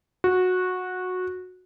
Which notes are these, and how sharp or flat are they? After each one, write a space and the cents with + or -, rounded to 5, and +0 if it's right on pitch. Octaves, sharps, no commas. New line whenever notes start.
F#4 -15